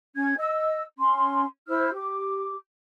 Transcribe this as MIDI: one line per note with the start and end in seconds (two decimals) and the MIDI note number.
0.16 0.33 61
0.16 0.33 92
0.38 0.82 75
0.38 0.82 88
0.98 1.45 61
0.98 1.45 84
1.68 1.90 64
1.68 1.90 72
1.68 1.90 88
1.68 1.90 89
1.93 2.53 67
1.93 2.53 86